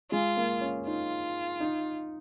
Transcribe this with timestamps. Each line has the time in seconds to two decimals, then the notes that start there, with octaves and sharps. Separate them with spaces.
0.11 G#3 F4
0.37 A#3
0.61 C#4
0.86 D#4 F4
1.60 D#4